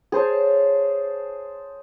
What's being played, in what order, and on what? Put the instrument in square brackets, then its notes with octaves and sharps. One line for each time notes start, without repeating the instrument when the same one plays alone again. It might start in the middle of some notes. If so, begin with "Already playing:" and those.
[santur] G#4 C5 C#5 A5